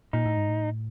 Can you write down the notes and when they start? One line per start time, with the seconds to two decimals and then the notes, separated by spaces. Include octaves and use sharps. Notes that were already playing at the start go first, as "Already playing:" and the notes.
0.13 A#2 D#4
0.26 A2
0.37 G#2
0.49 A2